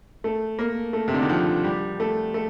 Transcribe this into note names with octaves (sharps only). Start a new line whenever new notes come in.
A3
A#3
A3
C3
D3
D#3
F3
G3
A3
A3